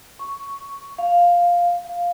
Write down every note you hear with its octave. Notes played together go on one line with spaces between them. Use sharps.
C#6
F5
F5